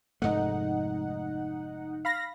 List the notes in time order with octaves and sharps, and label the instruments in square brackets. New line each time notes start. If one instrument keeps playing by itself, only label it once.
[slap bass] F1 G#2 A3 [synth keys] D#4 F#5
[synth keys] F5 B5 A#6